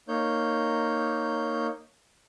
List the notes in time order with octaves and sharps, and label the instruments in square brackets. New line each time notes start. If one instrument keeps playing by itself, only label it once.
[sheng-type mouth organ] A#3 D#4 C#5 G6